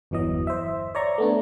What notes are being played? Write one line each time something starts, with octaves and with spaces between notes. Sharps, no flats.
G1 E2 E3 F#3 D#5
C5 E5
C#5 D5 A#5 C#6
A3 B3 D4